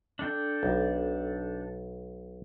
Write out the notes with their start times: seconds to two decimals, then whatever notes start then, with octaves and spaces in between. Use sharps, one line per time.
0.19 D4 A4 G5
0.63 B1